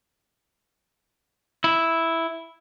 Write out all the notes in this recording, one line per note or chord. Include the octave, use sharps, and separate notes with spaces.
E4